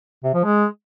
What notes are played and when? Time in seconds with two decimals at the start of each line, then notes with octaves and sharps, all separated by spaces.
0.24 C3
0.34 F3
0.44 G#3